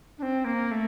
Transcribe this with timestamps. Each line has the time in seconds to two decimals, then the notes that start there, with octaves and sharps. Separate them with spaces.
0.18 D4
0.23 C4
0.45 A#3
0.71 A3